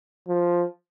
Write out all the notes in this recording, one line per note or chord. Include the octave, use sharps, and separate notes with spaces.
F3